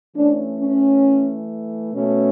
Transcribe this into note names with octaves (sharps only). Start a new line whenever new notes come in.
E3 A3 C#4 D4
C#4
B2 A3 C#4